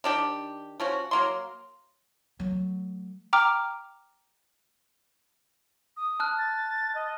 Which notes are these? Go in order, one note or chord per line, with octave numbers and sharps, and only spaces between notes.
D#3 D4 G4
F3 C#4 F#4
F#3 A#3 C6
F#3 A3
G5 A#5 D6 F6
D#6
A5 F6 F#6
A6
D#5